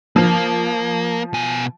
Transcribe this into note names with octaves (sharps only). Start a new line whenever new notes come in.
F3 A#3
B2 G#5